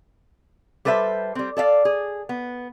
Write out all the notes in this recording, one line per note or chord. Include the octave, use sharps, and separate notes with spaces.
G3 A4 B4 C5 E5
G3 C4
A4 D5 E5 F5
G#4
B3